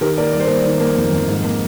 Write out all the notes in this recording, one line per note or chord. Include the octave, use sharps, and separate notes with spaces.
D#3 G4 A#4
A#3 A#4 D5
G3 D5
C5
A#3 A#4 D5
D#3
A#3
F2
F2
G#2
A#3